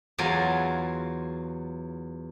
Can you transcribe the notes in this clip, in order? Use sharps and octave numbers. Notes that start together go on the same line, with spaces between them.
E2 F#3 F4 G#5